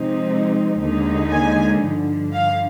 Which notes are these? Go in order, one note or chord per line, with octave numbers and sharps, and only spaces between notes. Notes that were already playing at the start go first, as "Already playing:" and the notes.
Already playing: C3 F3 G#3 C4 D#4
D#2 D3 G#3 D#4
G#5
G2 D3 F3
F5